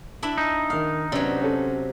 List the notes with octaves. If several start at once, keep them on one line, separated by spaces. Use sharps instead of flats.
D4 E4 E5
D#4
D#3 F5 D#6
C3 F#3 B3 C#4 D4
C#4 A4